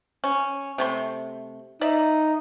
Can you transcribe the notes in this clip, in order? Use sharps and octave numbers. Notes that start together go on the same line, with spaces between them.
C#4
C3 A3 C6
D#4 D5 E5